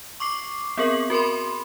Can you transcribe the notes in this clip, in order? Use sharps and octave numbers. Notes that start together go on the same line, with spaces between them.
C#6 D6 C7
B3 C4 G#4 A#4 F#7
F#4 A#4 B5 C6